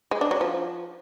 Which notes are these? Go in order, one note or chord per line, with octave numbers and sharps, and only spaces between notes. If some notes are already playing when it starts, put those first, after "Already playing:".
G#3
D4
F#3
F3